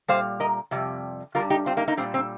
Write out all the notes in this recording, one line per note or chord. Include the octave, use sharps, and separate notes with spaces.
A#2 G3 C5 F5
A#4 D#5
F2 C3 G3
G2 D#3 G3 F4 A#4
D#4 G4
C4 F4
A#3 D#4
A#3 D#4
A#2 G3 C4
C4